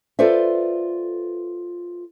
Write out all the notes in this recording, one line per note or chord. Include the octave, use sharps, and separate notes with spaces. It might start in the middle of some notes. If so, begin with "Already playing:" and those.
F4 A4 B4 C5 D5 E5